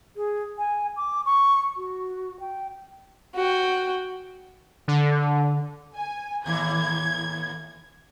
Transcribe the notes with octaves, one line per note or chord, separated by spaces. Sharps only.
G#4
G#5
D6
C#6
F#4
G5
F#4 G5
D3
G#5
D#2 A2 E3 G#6